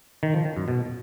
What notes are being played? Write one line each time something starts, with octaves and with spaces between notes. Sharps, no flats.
D#3
F3
D#3
F#2
B2